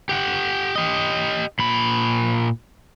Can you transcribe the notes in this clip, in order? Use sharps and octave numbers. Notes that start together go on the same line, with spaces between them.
G4 F#5
G4 D#5
A#2 B5